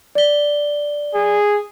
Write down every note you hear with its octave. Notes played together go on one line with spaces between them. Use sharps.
D5 G7
G#4